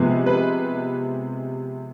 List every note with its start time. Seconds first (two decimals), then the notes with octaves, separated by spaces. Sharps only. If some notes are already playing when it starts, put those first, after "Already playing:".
Already playing: C3 F3 G#3 B3
0.26 B4